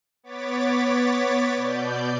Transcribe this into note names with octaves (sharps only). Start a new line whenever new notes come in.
B3 C#5 D6 A6 B6
B2 D5 G6